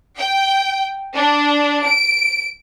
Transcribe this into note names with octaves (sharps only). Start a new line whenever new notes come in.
G5
D4
D7